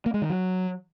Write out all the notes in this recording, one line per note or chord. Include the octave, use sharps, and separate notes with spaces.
A#3
G#3
D#3
F#3